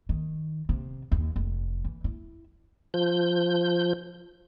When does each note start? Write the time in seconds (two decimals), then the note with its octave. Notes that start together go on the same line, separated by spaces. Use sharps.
0.09 D#3
0.69 C3
1.12 D#2
1.36 F1
1.85 E3
2.04 E4
2.94 F3 G6